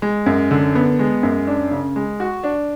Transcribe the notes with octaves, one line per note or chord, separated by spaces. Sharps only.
G#3
F#2
D3
B3
G#3
F#2
D4
C#3
G#3
F#4
D4